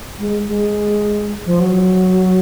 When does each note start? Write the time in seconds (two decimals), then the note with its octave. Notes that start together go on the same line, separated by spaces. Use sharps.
0.19 G#3
0.48 G#3
1.46 F3
1.60 F#3